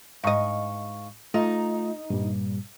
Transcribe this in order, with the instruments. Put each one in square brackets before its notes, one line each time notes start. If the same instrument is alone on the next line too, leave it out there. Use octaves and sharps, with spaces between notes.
[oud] G#2 D#5 [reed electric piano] F5 C#6
[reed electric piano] A3 F4 [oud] D#4
[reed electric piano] G2 A#2 G3